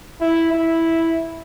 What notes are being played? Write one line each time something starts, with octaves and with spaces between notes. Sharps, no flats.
E4
E4